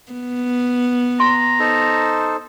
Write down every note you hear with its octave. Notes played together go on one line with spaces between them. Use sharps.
B3
A#5 C6
D#4 A4 C5